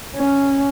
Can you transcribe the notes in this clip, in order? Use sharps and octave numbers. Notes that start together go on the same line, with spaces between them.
C#4